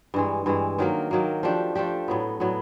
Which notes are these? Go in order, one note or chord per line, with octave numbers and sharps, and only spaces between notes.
G2 E3 G#3
G2 E3 G#3
D#3 F#3 A#3
D#3 F#3 A#3
F3 A3 D4 G4
F3 A3 D4 G4
A2 F#3 B3
A2 F#3 B3